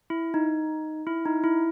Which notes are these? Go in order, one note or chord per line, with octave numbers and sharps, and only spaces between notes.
E4
D#4
E4
D#4
E4